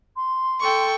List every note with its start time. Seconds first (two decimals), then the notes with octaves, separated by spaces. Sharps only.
0.16 C6
0.60 A4 G5 C#6